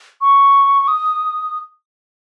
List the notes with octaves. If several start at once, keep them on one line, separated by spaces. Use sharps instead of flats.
C#6
D#6